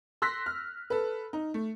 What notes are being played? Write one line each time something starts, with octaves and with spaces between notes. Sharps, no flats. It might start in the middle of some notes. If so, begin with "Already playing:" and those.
C6 E6 F#6 A#6 B6
F6
A4 B4
D#4
A3